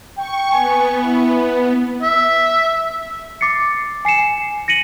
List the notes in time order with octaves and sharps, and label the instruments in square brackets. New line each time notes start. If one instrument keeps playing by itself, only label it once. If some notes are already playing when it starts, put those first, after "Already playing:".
[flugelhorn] G5 [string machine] C#6
[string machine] B3 [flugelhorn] G#5
[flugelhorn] E4
[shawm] E5
[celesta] D6 A6 C7 C#7
G#5 C7 C#7 E7
A#6 C#7 D#7 F#7